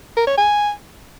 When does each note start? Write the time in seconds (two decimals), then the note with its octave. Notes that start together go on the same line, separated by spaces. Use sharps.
0.17 A#4
0.27 C#5
0.38 G#5